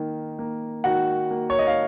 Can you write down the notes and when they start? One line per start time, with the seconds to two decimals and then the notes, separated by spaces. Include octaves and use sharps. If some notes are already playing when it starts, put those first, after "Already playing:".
Already playing: D#3 A#3
0.39 A#3
0.84 D#3 F#4 F#5
1.31 A#3
1.50 C#5
1.59 D#5
1.67 F5